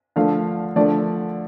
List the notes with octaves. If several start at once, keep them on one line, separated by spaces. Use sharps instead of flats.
D3 F3 A3 F5
D3 F3 A3 D5